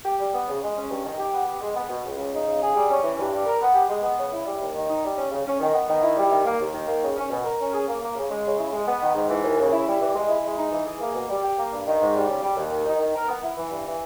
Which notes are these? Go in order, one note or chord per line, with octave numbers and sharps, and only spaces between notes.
G4
G3
B3
C#3
G#3
C#4
G2
D#3
G4
B3
G4
G#3
B3
B2
C#2
C#3
D#4
C#3
G#4
G3
C#4
E3
G2
G3
A#4
B3
G4
G#3
B3
C#3
E4
G3
D#2
D#3
D#4
G3
C#4
C#3
C#4
D#3
B3
D#3
E4
G3
D#3
A#3
D#2
D#3
A#3
C#3
C#4
B2
A#4
C#4
G#4
A#3
A#3
C#3
G#3
C#3
E4
G#3
B3
D#3
G#2
E3
D#2
C#3
E4
G3
E3
G#3
E4
G#3
D#4
E3
G#4
A#3
B2
G3
G4
A#3
G2
D#3
G#2
G3
C#3
G3
D#2
D#3
D#4
D#3
A#4
B3
E4
E3
G2
E3